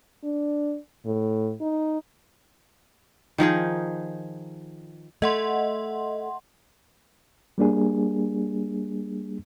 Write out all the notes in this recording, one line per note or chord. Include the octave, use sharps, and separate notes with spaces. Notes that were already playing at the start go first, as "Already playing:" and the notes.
D4
A2
D#4
D#3 F3 D#4 G#4
A3 D#5 F#5 C6
G3 A#3 D4 G#4